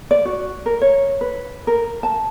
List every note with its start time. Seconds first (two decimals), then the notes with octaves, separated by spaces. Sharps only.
0.11 D5
0.25 F#4
0.66 A#4
0.81 C#5
1.21 B4
1.67 A#4
2.03 A5